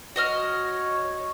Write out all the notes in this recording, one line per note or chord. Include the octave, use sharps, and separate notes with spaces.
F#4 C#5 D#5 F6